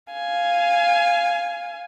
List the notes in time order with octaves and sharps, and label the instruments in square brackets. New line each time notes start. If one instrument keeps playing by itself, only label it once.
[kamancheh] F5 G#5